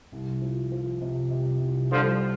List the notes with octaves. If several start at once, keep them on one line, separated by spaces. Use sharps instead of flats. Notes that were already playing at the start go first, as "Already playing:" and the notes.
C2
F3
F3
C3
C3
C2
D3 F3 G3
C4